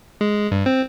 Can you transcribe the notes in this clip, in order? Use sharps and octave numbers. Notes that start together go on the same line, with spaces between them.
G#3
G2
C4